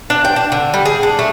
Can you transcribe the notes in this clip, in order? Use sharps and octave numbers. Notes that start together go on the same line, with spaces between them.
D4
G5
D4
D3
G3
G#4
D4
A3